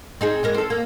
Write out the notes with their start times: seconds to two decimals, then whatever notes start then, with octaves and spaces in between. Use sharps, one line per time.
0.21 C4 D#4 G#4
0.43 E3 G#3 A#4
0.54 C4 A4
0.70 A#3